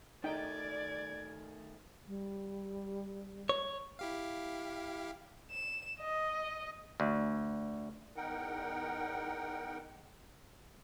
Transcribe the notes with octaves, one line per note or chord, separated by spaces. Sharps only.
D#3 A3 D#4 D5 G5 G#6
G3
C#5
E4 G4 F5
E7
D#5
D2
E2 D#4 A#4 F#5 G5